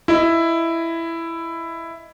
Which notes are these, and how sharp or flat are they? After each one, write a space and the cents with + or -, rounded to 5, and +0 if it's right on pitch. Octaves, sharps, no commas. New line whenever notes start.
E4 +10 D#5 +10